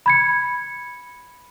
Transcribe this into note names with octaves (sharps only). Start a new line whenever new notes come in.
B5 G#6 C#7